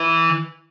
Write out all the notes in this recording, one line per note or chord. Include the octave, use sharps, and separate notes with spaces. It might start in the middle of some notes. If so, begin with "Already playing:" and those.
Already playing: E3